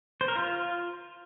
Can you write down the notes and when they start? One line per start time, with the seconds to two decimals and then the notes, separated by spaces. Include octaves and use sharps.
0.21 C5
0.28 A#4
0.36 F4